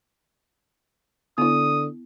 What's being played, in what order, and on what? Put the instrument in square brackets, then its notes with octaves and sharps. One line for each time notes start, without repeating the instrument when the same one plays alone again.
[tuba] D3 [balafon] B3 E4 [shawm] D#6